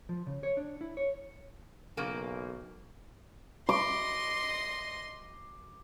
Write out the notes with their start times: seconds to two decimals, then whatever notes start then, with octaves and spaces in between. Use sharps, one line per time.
0.09 F3
0.27 C#3
0.43 C#5
0.57 D4
0.81 E4
0.97 C#5
1.97 B1 C#3 A#3
3.69 D#5 C6 D6